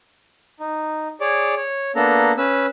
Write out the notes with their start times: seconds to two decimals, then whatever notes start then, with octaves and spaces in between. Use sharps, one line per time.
0.60 D#4
1.21 G#4 C#5 D5
1.57 C#5
1.96 A#3 B3 D4 A4 A#5
2.38 C#4 B4 E6